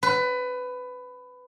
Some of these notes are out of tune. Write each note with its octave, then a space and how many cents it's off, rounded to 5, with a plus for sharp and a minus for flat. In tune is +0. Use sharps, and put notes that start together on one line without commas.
B4 +20